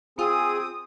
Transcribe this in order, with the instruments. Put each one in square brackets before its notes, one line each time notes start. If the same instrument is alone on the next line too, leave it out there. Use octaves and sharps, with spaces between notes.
[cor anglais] C4 [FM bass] F4 [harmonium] G#4 [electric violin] D#6